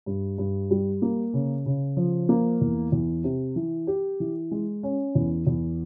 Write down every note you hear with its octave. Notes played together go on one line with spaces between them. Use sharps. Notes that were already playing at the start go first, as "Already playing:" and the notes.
G2
G2
G3
A#3
C#3
C#3
F3
A#3
E2
E2
C3
E3
G4
E3
G#3
C#4
E2
E2